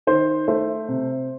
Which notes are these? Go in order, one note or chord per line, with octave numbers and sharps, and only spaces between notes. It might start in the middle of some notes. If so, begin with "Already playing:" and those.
D#3 C5
A3 C5
C3